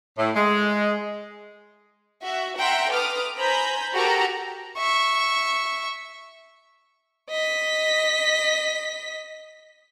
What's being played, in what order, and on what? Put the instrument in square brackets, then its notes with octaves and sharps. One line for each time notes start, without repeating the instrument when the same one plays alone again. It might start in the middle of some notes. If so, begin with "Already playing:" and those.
[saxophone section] A2
G#3
[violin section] F#4 E5
E5 F#5 G5 A#5 C6
A4 B4 D6 D#6 F6
C5 G#5 A#5 B5 G6
F#4 G4 A4 A#4 F#5 A#5
[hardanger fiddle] E5 C#6
[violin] D#5 B6